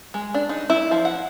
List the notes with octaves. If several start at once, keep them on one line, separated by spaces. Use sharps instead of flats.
G#3
D4
D#4
E4
F3
F#5